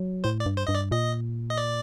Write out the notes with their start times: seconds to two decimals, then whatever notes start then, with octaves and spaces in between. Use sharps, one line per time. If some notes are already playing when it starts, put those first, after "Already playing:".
Already playing: F#3
0.24 A2 C5
0.40 D5
0.46 G2
0.57 C5
0.67 G2 D#5
0.75 D5
0.91 A#2 D#5
1.50 D#5
1.58 D5